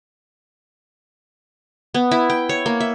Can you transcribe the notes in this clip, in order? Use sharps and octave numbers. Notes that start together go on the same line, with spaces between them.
B3
E4
G5
C#5
A#3
E5